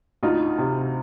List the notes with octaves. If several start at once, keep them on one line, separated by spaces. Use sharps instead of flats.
D2 D#4 F4
C3